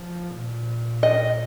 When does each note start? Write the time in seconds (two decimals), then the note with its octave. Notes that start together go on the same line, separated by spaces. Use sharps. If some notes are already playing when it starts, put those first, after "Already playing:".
Already playing: F3
0.31 A#2
1.03 D#5